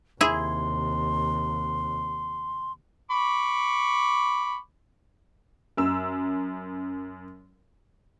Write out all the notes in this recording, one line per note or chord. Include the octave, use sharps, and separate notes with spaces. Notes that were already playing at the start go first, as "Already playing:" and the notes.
D#2 C3 E4 G#4 C6
B5 C#6 D6
F#2 E6